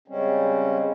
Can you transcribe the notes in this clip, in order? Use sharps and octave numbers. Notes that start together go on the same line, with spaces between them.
C#3 G3 G#3 C4 C#4